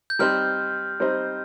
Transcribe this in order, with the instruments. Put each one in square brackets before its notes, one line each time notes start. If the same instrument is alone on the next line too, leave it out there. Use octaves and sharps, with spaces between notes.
[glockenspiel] G6
[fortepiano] G3 C4 D#4 C5 [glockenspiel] F6
[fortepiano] G3 C4 D#4 C5